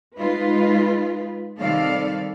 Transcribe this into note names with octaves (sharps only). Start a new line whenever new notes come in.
G#3 D#4 F4 B4
C3 D#3 G3 A4 D5 F5